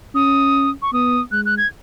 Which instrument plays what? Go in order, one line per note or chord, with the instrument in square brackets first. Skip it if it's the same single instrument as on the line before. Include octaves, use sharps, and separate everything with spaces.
[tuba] C#4 [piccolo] D#6
[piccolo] C#6
[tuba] B3 [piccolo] D#6
[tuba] G#3 [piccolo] F#6
[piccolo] F#6
G#6